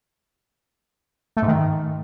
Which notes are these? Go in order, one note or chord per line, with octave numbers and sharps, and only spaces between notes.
A3
G#2
D#3